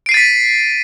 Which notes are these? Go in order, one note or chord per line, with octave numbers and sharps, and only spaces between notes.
A6 B6 C7 D7 D#7